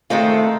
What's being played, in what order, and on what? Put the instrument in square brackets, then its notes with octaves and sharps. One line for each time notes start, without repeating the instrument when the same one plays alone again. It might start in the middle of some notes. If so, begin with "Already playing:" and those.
[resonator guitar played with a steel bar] D#3 G#3 C4 F4 [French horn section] A3